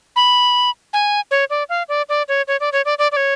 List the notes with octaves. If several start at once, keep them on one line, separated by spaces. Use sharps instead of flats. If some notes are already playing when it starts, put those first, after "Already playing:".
B5
G#5
C#5
D5
F5
D5
D5
C#5
C#5
D5
C#5
D5
D5
D5
C#5